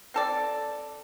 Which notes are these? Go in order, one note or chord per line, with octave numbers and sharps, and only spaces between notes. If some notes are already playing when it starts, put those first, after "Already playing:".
C4 A4 D5